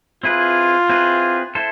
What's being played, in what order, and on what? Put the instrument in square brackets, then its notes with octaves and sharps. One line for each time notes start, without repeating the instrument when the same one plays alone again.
[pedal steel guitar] C4 E4 G#4 B4 [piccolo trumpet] F4
[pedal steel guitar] C4 E4 G#4 B4
E4 A4 C5